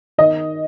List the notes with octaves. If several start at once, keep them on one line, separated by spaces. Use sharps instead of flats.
D#3 D#5